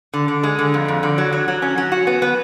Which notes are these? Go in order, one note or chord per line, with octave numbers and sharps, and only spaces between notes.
D3
D3
G#3
D3
F2
F2
D3
F#3
F#3
F#3
C#4
F#3
F#4
B3
B3